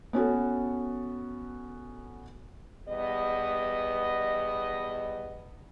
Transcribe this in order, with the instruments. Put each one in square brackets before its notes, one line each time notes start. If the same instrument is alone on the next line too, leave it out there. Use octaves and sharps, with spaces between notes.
[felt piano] B3 C#4 F#4 A4
[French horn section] E2 G3 B3 D#5